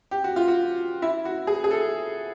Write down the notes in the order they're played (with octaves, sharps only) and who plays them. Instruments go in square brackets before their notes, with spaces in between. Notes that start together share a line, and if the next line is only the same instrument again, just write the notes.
[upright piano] G4
F#4
F4
F#4
E4
F#4
G#4
G#4
A4